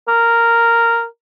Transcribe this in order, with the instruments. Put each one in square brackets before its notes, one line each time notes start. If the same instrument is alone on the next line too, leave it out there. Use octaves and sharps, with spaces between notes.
[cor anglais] A#4